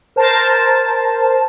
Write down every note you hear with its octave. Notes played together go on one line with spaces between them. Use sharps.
A#4 C5 A5